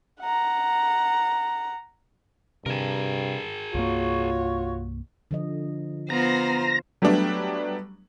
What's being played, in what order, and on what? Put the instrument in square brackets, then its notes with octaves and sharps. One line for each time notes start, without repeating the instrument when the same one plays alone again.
[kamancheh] F#5 A#5
[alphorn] G2 [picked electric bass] C3 [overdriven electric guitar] G#4 A#4
[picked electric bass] C2 G2 A#3 [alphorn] F4 [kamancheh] F#4 C#5
[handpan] D3 F3 D#5
[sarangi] B3 [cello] F4 C5 [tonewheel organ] A#5 A#6
[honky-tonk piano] F#3 G3 A3 B3 D4